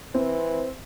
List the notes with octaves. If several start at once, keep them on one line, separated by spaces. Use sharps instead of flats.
E3 C4